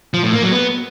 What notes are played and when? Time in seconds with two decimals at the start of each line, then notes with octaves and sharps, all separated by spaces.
0.14 F3
0.23 A2
0.33 A#3
0.43 F#3
0.52 B3